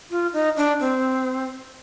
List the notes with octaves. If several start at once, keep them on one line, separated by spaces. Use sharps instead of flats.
F4
D#4
D4
C4